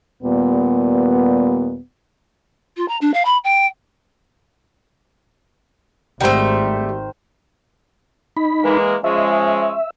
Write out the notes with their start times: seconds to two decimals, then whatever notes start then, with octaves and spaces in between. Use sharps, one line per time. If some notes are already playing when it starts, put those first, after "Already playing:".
0.23 D#2 A#2 G3 B3
2.77 F4
2.88 A#5
3.01 D4
3.14 F5
3.25 B5
3.44 G5
6.21 G#1 D#3 G3 A3 C5
8.37 D#4 B5
8.64 E3 G#3 A#3
9.04 F3 G#3 C#4 E5